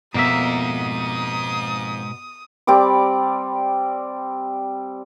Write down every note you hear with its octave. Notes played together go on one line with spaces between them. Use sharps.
F2 G#2 B2 A#3 E5 D#6
G3 C4 D5 D6